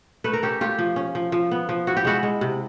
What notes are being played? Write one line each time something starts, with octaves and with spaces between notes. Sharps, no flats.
A3 A4 B4
A#4
C#4 G4 A4
A3 F4 G4
F3
C#4
F3
F3
B3
F3
E4 F#4
G4
G#3 E4 F#4
G#3
C3